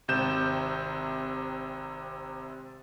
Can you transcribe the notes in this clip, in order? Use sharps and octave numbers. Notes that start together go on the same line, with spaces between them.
G#1 C3 G6 E7